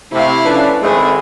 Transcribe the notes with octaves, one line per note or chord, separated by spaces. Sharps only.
C3 A3 E4 F5
F3 A3 C#4 D4 B4
G#1 G#3 A3 C4 G#4 B4